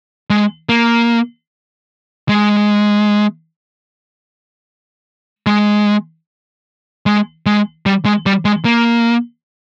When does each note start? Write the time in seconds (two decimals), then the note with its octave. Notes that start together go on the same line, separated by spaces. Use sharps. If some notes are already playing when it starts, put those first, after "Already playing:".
0.30 G#3
0.69 A#3
2.29 G#3
5.47 G#3
7.06 G#3
7.46 G#3
7.86 G3
8.06 G#3
8.26 G3
8.45 G#3
8.65 A#3